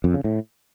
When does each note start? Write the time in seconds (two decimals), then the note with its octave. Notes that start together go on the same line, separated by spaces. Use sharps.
0.04 F2
0.14 C#3
0.24 A2